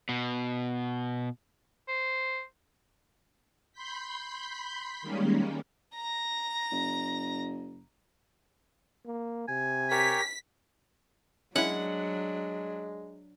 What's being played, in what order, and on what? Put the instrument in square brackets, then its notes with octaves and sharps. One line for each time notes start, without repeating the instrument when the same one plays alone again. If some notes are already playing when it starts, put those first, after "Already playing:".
[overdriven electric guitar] B2
[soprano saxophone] C5
[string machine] B5 C6 G6 B6
D#3 G3 G#3 A#3 C#4
[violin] A#5 A#6
[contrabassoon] F#1
[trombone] A#3
[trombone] C3 [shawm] G#5
[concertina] G4 A#4 C#5 [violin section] B6
[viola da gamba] F#3 D4 [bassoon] G#3 [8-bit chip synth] C#4 E4 [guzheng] F#5